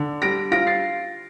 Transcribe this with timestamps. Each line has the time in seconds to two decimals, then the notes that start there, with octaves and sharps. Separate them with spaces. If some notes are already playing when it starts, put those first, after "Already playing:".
Already playing: D3
0.22 G3 A#6 D7
0.51 F4 A#6 D7
0.67 A6 C7